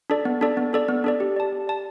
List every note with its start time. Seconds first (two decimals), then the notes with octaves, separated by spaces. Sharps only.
0.10 D4 A4 D5
0.25 B3
0.41 D4 A4 D5
0.57 B3
0.73 D4 A4 D5
0.88 B3
1.04 D4 A4 D5
1.20 G4
1.36 D5 A5
1.52 G4
1.67 D5 A5